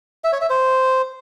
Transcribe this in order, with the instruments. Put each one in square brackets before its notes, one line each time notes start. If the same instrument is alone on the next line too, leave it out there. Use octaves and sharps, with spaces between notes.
[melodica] E5
C#5
E5
C5